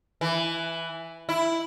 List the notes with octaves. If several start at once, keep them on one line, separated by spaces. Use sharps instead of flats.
E3
E4